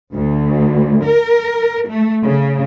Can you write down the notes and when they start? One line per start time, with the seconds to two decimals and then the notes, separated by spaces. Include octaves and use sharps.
0.13 D2
1.04 A#4
1.89 A3
2.25 C#3